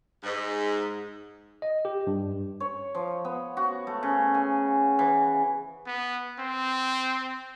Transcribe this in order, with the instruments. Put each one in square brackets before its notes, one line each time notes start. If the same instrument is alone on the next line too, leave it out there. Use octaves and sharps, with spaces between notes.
[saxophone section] G#2
[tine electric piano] D#5
G4
G2
[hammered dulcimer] C#5
F3
B3
F#4
A3
C#3
G#5
E3
[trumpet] B3
C4